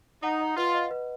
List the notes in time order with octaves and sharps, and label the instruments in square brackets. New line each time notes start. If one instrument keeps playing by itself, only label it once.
[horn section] D#4 [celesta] F#5
[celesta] D#5
[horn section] F4 [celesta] B4
[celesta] D#5
B4